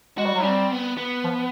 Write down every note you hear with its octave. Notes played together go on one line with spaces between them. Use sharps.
G#3 F#4
G3
F#3
G3 C4
B3
B3
F3